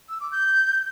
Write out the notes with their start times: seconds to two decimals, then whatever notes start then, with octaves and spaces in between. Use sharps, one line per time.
0.09 E6
0.20 D6
0.32 G6